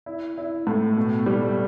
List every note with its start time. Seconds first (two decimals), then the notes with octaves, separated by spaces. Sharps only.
0.06 E4
0.38 E4
0.67 A2
0.96 B2
1.26 G3